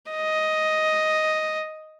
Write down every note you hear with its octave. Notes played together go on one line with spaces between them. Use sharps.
D#5